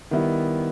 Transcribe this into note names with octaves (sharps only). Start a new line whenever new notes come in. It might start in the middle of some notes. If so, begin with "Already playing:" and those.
D#3 G3 B3 E4